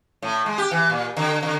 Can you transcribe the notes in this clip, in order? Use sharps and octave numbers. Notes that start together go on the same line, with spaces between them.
A2
G#3
G4
E3
A#2
D3
D3